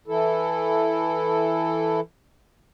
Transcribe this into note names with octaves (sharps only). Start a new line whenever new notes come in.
E3 E4 A4